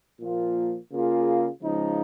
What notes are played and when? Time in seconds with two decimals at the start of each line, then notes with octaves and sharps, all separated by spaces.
0.20 A#2 F3 A#3 F4
0.92 C#3 A#3 F4 G#4
1.62 C#3 F3 G#3 D#4